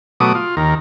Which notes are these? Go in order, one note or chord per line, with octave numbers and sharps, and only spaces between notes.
B2 F#3 A3 D6 D#6
F4
D#2 A#4